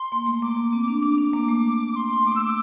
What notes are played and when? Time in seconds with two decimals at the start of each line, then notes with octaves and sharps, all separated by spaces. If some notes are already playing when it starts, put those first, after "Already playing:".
Already playing: C6
0.12 A#3
0.26 A3
0.42 A#3 D6
0.57 A#3
0.73 C4
0.88 D4
1.03 D4 D6
1.18 D4
1.34 A#3 D6
1.48 A3
1.95 C6
2.25 A3 D6
2.35 E6
2.45 D6